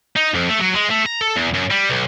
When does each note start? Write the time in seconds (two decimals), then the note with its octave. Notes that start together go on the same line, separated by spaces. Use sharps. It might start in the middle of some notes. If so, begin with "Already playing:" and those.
0.16 D#4
0.34 F2
0.49 A3
0.60 F#3
0.75 G#3
0.90 A3
1.06 A#5
1.21 A4
1.36 E2
1.55 F#2
1.71 G3
1.89 B1